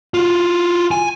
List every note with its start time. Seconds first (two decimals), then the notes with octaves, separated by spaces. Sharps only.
0.14 F4 F#4
0.91 G#5